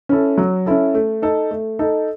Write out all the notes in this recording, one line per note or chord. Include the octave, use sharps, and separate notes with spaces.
C#4 E4 A4
F#3
C#4 E4 A4
A3
D#4 A4
A3
D#4 A4